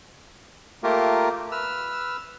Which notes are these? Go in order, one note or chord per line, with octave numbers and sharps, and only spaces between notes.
A3 A#3 F4 G4 A#4
B4 E6 F6